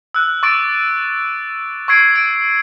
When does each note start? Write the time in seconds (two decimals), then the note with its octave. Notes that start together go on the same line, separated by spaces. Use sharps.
0.14 E6 F#6
0.43 C#6 D6 A6 D7
1.88 C#6 E6 G#6 C7 D7
2.16 D7